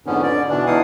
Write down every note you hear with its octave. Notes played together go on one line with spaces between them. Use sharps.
F2 G#2 D3 B3 C#4
D3 D5
B2 E3 D4
E2 D#4 E4 F5 F#5 D#6